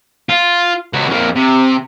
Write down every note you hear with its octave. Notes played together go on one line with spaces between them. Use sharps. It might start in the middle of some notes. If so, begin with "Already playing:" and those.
F4
C#2 F#4
F2 A#3
C3